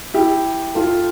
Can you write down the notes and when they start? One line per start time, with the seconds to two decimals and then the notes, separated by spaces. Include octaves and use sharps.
0.14 E4 G4
0.75 F4 A4